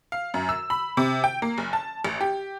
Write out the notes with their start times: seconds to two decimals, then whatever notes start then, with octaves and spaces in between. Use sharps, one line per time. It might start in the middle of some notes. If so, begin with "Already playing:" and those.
0.12 F5
0.34 F#2
0.49 E6
0.70 B5
0.97 C3
1.24 G5
1.42 A#3
1.58 F#1
1.73 A5
2.05 A1
2.21 G4